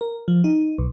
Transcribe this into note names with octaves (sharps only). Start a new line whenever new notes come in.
A#4
F3
D#4
B1